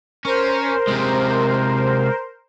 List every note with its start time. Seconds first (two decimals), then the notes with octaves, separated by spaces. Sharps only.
0.25 C#4 A#4 C5
0.88 C3 G#3